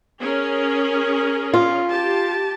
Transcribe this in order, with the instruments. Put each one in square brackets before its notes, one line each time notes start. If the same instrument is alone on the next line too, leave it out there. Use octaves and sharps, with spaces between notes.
[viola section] C#4 G#4 A#4
[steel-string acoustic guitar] F4
[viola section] G4 A5